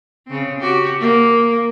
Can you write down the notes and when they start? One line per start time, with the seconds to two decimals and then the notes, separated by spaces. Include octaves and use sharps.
0.27 C#3 C4
0.60 F#4 G4
1.00 A#3